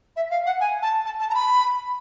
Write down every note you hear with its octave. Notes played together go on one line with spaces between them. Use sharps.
E5
F5
F#5
G#5
A5
A5
A5
A#5
B5